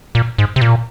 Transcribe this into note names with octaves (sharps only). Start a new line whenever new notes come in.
A#2
G#2
C3
A#2